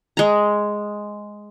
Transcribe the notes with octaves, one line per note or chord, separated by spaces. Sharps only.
G#3 A#5